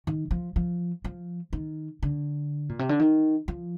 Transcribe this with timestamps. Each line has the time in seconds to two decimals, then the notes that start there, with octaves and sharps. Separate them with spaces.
0.07 D#3
0.31 F3
0.56 F3
1.04 F3
1.53 D#3
2.03 D3
2.69 A#2
2.79 C3
2.89 D3
3.00 D#3
3.48 F3